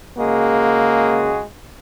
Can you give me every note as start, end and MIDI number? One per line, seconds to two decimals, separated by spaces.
0.17 1.41 49
0.17 1.41 56
0.17 1.32 58
0.17 1.41 66